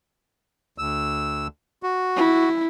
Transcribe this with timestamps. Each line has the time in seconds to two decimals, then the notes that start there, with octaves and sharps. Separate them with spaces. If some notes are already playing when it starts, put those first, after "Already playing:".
0.78 D2 E6
1.83 F#4
2.16 E4